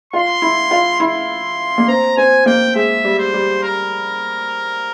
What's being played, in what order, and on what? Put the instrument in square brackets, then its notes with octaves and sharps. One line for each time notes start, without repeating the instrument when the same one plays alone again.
[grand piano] F4 [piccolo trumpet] C6
[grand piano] E4
F4
[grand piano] E4 [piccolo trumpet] C6
[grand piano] A#3
[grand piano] C4 [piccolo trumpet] A#5
[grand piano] C4 [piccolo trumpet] G#5
[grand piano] A#3 [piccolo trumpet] G5
[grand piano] G#3 [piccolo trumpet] E5
[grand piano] G3
[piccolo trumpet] C5
[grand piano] G3
[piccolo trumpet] A#4